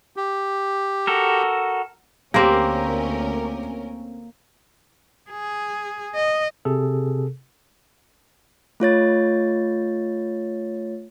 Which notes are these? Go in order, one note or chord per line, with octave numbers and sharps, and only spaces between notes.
G4
F#4 A4 A#4
D2 A#3 C4 C#4 G4 A#4 A#6
G#4
D#5
C3 G#4 A4
A3 F4 C#5 A6